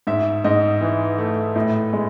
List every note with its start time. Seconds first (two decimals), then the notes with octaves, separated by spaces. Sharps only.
0.07 G#2 E5
0.44 G#2 D#5
0.81 E3
1.18 A3
1.55 A2
1.93 G#3